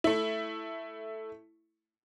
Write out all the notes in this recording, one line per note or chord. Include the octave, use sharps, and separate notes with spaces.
A3 E4